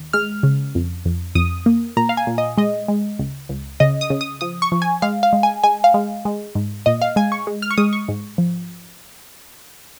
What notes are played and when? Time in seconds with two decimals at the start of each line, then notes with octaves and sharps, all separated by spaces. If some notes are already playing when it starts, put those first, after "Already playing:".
Already playing: D#2
0.13 G#3 F6
0.43 C#3
0.75 F2
1.06 F2
1.35 F2 D#6
1.66 A#3
1.97 A#2 A#5
2.09 F5
2.17 G#5
2.27 A#2
2.38 D#5
2.58 G#3 D#5
2.88 G#3
3.19 C#2
3.49 C#2
3.80 C#3 D#5
4.01 D#6
4.10 C#3
4.21 D#6
4.41 F3 D#6
4.62 C#6
4.72 F3
4.82 G#5
5.02 G#3 F5
5.23 F5
5.33 G#3
5.43 G#5
5.64 G#3 G#5
5.84 F5
5.94 G#3
6.25 G#3
6.55 G#2
6.86 A#2 D#5
7.02 F5
7.16 G#3 G#5
7.32 C#6
7.47 G#3
7.62 F6
7.71 C#6
7.78 G#3 D#6
7.93 C#6
8.08 G#2
8.38 F3